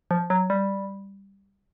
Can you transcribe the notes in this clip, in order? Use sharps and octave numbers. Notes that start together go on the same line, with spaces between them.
F3
F#3
G3